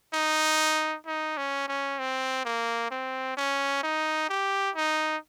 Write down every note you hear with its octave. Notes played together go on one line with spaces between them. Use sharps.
D#4
D#4
C#4
C#4
C4
A#3
C4
C#4
D#4
G4
D#4